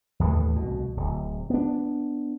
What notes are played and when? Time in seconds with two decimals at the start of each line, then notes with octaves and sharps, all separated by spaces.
0.20 D#2 A2 D3 E3
0.56 C2 B2
0.97 D1
1.50 B3 D4